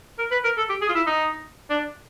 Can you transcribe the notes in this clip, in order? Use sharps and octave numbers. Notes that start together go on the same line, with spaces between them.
A#4
B4
A#4
A4
G4
G#4
F4
E4
D#4
D4